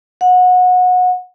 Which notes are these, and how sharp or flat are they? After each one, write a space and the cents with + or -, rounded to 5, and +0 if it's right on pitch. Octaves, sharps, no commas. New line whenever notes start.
F#5 -25